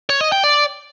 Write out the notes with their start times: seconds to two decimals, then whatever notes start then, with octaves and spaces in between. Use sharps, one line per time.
0.10 C#5
0.21 D#5
0.32 G5
0.44 D5